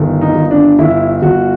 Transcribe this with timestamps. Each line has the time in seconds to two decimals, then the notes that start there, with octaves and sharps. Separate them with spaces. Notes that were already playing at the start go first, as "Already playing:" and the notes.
Already playing: G1 D#3
0.21 D#4
0.35 G1
0.51 D4
0.78 G1 E4
1.22 G1 F#4